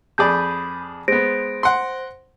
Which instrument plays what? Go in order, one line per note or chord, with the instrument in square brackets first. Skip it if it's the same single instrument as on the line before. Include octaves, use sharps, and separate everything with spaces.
[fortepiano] F2 G#4 D5 [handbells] B5 D#6 G6
[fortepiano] G#3 B3 [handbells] C5 A#6 D7
[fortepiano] F#5 C6